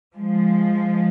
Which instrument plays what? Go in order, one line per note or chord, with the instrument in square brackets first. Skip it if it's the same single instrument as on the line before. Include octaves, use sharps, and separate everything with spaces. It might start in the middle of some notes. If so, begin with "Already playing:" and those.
[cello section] F3 G#3